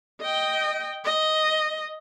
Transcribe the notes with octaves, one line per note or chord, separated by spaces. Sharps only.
D#5 G5
D#5